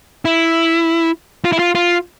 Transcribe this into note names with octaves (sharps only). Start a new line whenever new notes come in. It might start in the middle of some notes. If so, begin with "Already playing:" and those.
E4
F4
E4
F4
F4